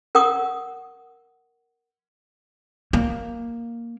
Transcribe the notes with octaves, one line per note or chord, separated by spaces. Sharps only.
A#4 F#5 C#6 D#6
A#3